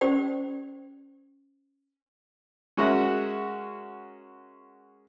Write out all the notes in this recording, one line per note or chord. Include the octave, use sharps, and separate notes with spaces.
C#4 G4 C5 D5 G5
G#3 C#4 F#4 A#4 E5 F#5